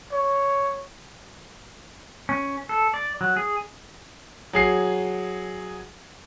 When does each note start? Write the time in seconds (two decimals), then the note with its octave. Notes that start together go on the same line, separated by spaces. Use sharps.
0.11 C#5
2.29 C#4
2.69 A4
2.94 D5
3.21 F#3
3.37 G#4
4.53 F#3 G#4 C7